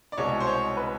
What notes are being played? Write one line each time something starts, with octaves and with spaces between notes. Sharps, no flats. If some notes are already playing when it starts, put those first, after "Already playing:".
D5
C2 B2 G#3 C#5
C5
C#5
B4